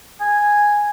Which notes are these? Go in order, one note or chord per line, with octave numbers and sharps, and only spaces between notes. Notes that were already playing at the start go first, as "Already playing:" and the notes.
G#5